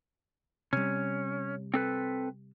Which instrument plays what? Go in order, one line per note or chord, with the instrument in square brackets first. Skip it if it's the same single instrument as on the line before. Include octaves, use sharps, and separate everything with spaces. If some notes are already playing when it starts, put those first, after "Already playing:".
[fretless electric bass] C3 G3 [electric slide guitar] C#4
[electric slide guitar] C4 A4 B4